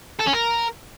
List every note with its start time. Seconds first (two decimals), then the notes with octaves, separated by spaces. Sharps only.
0.20 A4
0.27 C#4
0.34 A#4